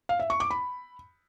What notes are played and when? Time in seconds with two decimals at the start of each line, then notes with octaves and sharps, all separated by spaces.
0.09 F5
0.20 E5
0.30 C#6
0.40 D6
0.51 B5